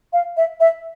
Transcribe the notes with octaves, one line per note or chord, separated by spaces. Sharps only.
F5
E5
E5